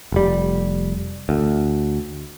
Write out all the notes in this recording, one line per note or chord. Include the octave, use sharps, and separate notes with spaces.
F1 G3
D2